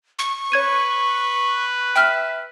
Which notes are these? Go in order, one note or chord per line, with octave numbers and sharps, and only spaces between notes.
C#6
B4 C#5 G#6 D#7
E5 G5 F6